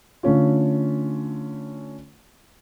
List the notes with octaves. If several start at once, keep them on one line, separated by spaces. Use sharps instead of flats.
D3 A3 C#4 F4